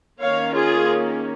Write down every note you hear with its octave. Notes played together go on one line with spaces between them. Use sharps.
D#3 A#3 C#4 C#5 F5
F4 G#4